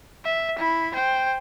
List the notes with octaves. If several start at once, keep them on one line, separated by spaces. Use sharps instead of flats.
E5
E4 B5
C5 G5